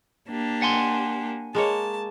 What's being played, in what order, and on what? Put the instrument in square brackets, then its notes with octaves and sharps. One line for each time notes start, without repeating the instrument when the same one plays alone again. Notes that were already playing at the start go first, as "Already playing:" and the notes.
[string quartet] A#3 D4 G4
[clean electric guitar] F#5 G#5 C6
[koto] G#3 A#3 C#5 [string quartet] A5